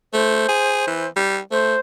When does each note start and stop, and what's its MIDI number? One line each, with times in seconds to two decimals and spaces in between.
0.13 0.46 57
0.13 1.09 72
0.48 0.83 68
0.87 1.06 52
1.16 1.38 55
1.51 1.75 57
1.51 1.80 72